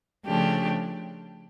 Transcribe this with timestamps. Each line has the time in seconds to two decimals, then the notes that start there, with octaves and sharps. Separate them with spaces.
0.25 C#3 F3 A3 D4 G4